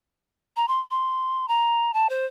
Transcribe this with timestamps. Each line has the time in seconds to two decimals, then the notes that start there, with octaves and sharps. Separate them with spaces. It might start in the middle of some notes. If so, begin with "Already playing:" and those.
0.56 A#5
0.68 C6
0.91 C6
1.48 A#5
1.94 A5
2.09 C5